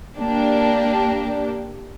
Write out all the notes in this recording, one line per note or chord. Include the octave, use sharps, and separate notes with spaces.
A#3 D4 G4